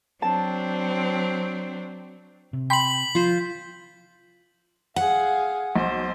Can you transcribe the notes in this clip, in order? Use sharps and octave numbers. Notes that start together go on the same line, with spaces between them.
F#3 C4 D4 A5
C3
G5 B5 C6 B6 F#7
F3 F4 C5
G#4 F5 F#5
B1 C5